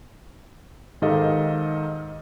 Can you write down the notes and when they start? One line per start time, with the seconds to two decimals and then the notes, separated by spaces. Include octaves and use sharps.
1.02 G#2 D#3 G4 A4 D#5 F5